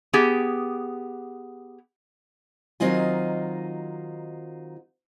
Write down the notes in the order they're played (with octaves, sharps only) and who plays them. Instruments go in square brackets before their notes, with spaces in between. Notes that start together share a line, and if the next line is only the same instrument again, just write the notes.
[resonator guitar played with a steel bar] B3 G4 G#4
[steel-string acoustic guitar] D#3 F#3 C4 D#4 F4 G#5